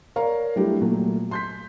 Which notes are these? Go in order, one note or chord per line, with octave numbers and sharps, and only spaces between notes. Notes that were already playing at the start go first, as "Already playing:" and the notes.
A#4 C#5 D5 F5 A#5
F#3 G3 A3 D4 E4 G4
A#2 F#3 A3
C6 G6 B6